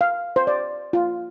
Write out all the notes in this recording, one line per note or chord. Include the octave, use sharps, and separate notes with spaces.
F5
C5
D5
F4